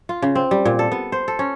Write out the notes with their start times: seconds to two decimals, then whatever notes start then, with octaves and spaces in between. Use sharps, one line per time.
0.09 F4
0.22 C#3
0.35 C4
0.51 G3
0.65 A#2
0.79 A4
0.92 B3
1.12 C5
1.28 A4
1.39 C#4